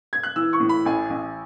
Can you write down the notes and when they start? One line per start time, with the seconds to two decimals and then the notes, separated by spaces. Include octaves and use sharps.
0.13 G#6
0.23 F#6
0.36 E3 E6
0.53 C#6
0.60 A2
0.69 B5
0.85 A1 G#5
1.10 A1